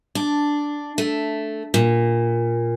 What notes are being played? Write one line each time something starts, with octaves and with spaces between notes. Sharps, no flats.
D4
A3
A#2